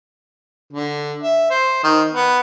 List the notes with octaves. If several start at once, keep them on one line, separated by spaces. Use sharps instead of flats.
D3
E5
C5
D#3
B3